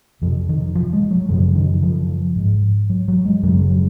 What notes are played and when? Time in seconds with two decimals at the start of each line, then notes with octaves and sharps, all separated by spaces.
0.22 F2 C3 F3
0.49 D#3
0.75 F3
0.93 G#3
1.11 F#3
1.29 F#2 C#3 F3
1.55 D#3
1.83 F3
2.36 G#2
2.90 F#3
3.08 F#3
3.25 G#3
3.43 F#2 F#3
3.47 C#3
3.70 F#3